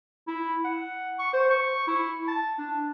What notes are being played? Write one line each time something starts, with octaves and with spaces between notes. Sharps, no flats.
E4
F#5
C#6
C5
C#6
E4
A5
D4